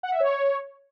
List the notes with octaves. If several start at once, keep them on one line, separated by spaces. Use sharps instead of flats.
F#5
E5
C#5